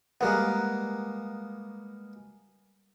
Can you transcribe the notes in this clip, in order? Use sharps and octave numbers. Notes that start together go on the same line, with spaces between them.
G3 G#3 A#3 B3 A#4 F#5